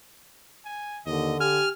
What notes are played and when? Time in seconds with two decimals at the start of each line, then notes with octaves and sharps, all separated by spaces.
0.65 G#5
1.06 D#2 D3 D#5
1.40 G4 G#5 F6